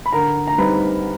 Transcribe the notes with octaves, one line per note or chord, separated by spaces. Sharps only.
B5
D3 A#4 A#5
A#5
G3 C4 D#4 B4 B5